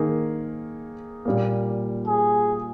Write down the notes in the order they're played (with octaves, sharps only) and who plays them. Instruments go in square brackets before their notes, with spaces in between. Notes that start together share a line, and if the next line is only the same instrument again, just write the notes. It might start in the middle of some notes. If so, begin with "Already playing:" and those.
Already playing: [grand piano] D#3 A#3 D#4 G#4
A#2 G3 A#3
[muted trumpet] G#4